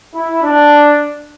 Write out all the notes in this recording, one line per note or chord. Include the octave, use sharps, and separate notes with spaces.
E4
D4